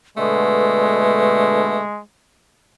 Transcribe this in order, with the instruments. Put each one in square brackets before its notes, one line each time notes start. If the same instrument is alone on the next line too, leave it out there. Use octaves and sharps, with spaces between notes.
[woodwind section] B2 D3 [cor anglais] G#3 [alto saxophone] A3 [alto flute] B4